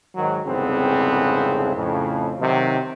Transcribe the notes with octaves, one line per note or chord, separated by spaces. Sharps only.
G#2 D#3 F#3
C2 F2 G#2 C#3 B3 C4
F2 A2 C#3
C3 D#3 F#3